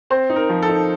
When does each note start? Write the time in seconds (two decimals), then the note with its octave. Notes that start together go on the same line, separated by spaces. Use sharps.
0.10 C4 C5
0.30 D#4
0.36 A#4
0.49 F3
0.63 A4
0.69 D#4